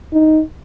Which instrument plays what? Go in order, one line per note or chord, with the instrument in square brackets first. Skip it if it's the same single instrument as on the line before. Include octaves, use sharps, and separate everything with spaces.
[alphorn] D#4